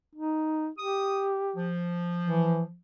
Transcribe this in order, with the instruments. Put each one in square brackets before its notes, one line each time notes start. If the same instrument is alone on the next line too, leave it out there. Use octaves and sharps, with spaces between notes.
[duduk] D#4
[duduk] G4 [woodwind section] D#6
[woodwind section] F3
[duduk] E3